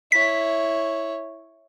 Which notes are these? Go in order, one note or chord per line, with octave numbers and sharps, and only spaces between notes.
E4 C#5 B6